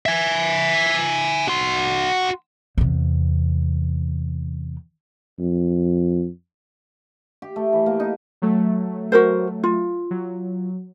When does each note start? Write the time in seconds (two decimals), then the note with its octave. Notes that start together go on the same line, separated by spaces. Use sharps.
0.06 E5 G#5
1.48 F#4 C6
2.78 E2 C3
5.39 F2
7.42 G4
7.56 A3
7.73 E3
7.86 A#3
8.00 D#4
8.42 F#3 A3
9.12 F#4 A#4 C5
9.64 F4
10.11 F#3